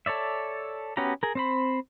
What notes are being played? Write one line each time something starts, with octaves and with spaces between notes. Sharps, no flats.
A4 C#5 D5 E5
B3 C#4 F#4 G4 A#5
G#4 A#4
C4 C5 B5